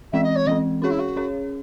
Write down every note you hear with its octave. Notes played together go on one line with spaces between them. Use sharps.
E3 G#3 C4 E5
D#5
C#5
E3 G#3 C4 D#5
C#4 F#4 G#4 C#5
E4
F#4
C#4 G#4 C#5